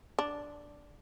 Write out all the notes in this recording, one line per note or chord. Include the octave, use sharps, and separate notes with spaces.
D4